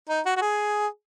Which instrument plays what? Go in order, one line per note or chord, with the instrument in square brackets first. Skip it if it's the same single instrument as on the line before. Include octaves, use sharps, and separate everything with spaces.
[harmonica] D#4
F#4
F#4
G#4